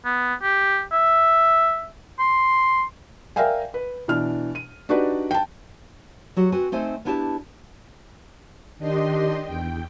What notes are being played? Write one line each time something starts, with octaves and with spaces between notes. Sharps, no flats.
B3
G4
E5
C6
A#4 D5 E5 F5 G5 G#5
B4
B2 E3 D4 F6
D#7
D4 D#4 F#4 G4 B4 D5
G5 A5
F#3 F#4 G4
C4 F#4 B4 G#5
A3 C4 D#4 C5 G#5
B3 D4 E4 G4 G#5 A5
D#3 D4 G4 D#5 C6
E2 G5